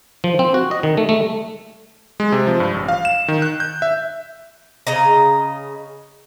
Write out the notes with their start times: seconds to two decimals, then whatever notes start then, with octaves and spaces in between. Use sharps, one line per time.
0.24 F3
0.39 C4
0.54 F#4
0.71 D#5
0.83 D#3
0.97 A3
1.09 A3
2.20 G#3
2.32 C3
2.47 F3
2.60 G2
2.74 A1
2.88 F5
3.05 E7
3.28 D#3
3.42 F#6
3.60 G6
3.82 E5
4.87 C#3 D#5 A#5